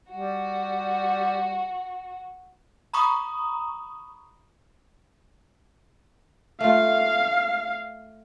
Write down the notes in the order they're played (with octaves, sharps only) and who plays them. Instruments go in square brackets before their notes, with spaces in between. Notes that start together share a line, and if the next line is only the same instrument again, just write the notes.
[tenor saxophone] G3 [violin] F#4
[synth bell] A#5 B5 C#6 D#6
[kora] A3 F4 [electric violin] F5